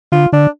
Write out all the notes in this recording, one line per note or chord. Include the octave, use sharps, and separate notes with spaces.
D3 F4
D3 D4